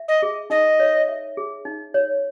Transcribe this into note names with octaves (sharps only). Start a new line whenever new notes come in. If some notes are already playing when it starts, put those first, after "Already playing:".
Already playing: E5
D#5
G#4
D#4 D#5
C#5
E5
G#4
D#4
C#5